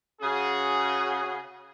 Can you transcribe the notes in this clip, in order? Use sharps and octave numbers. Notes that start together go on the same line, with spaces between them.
C#3 C#4 F#4 G#4